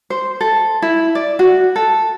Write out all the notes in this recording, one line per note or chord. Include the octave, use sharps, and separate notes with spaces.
C5
A4
E4
D5
F#4
A4